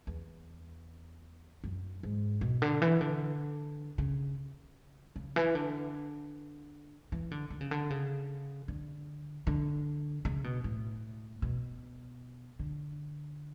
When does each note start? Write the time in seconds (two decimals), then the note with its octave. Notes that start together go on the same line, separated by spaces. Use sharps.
0.07 E2
1.64 F#2
2.03 G#2
2.41 B2
2.62 D3
2.82 E3
3.01 D3
3.98 C#3
5.16 C#3
5.36 E3
5.55 D3
7.12 E3
7.31 D3
7.50 D3
7.61 C#3
7.71 D3
7.90 C#3
8.68 D3
9.47 D3
10.25 C#3
10.44 B2
10.64 A2
11.42 B2
12.59 D3